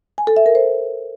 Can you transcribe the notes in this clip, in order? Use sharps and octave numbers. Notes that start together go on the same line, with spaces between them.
G#5
A4
E5
A#4
C5